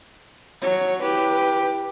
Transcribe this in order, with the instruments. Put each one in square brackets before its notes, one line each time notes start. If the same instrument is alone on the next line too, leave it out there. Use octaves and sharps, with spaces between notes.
[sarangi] F#3 [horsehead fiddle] C#5
[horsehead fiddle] E4 B4 [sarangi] G4